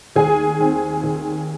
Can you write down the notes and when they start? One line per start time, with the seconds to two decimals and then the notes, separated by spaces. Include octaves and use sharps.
0.16 D#2 G#4 G#5
0.59 D#3 C4
1.03 D#2